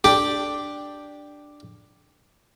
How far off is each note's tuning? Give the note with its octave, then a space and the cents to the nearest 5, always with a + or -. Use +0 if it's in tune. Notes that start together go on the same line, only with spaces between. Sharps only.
D4 +0 G4 +0 G5 +0